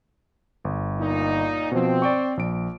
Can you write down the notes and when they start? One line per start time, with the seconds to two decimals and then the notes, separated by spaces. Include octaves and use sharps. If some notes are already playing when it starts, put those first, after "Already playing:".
0.65 G1
0.98 A#2 D#4
1.72 B2 F3 C4
2.02 D5 G5 C#6
2.37 A#1 D7